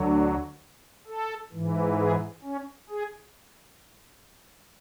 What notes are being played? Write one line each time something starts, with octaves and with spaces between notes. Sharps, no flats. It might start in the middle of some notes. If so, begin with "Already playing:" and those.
Already playing: D2 D3 F#3
A4
G#2 E3
G#4
C#4
G#4